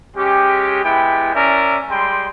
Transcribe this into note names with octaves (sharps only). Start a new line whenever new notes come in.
G#3 C#4 G4
G#3 B3 E4 G4 G5
C#4 A#4 D5 E5 A#5
G3 G#3 G5 C6